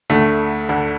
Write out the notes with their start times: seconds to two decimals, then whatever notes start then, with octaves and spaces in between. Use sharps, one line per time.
0.10 D2 D3 A3
0.69 D2 D3